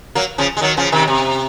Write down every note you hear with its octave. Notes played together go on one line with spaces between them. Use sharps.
F#3 A#3
C#3 F3
G#3
D#3 F#3
C#3 F3
C3 D#3
C3